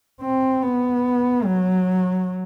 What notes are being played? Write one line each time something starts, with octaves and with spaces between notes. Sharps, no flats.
C4
B3
F#3